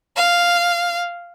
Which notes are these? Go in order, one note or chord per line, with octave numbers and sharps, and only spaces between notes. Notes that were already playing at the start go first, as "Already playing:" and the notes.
F5